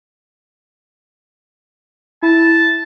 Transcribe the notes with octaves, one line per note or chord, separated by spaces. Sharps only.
E4 A5